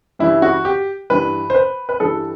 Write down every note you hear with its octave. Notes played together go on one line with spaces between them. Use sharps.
G2 E3 G3 E4
F#4
G4
G2 E3 G3 B4
C5
B4
B4
G2 E3 G3 A4